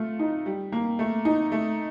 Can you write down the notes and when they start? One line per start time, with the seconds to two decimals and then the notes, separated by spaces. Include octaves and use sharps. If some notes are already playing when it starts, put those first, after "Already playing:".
Already playing: A3 F4
0.19 D#4
0.46 G3
0.72 A#3
0.99 A3
1.25 D#4
1.52 A3